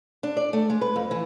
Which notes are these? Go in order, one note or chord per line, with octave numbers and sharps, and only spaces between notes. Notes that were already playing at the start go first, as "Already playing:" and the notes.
D4
D5
A3
G#3
B4
F2
E3